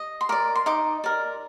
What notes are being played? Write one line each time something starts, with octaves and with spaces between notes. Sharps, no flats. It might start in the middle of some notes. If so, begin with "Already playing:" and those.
Already playing: D#5
C6
A#4 D5 D6
C6
D#4 D6
A#4 D5